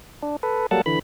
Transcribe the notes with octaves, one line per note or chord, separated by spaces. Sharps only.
D4
A4 B4
F#3 G3 A#3 A4 F#5 A5
D3 E3 B5